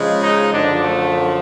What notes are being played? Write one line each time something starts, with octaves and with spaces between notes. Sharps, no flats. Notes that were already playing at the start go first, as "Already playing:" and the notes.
Already playing: C#3 F3 G#3
D#4
F#2 D3 F3 D4
A3